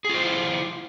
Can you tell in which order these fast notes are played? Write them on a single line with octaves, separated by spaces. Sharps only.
G#4 F4 C5 E4